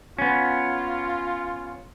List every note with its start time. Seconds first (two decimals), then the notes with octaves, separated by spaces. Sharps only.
0.19 B3 C#4 F4